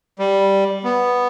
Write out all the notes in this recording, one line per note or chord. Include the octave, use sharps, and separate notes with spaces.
G3
B3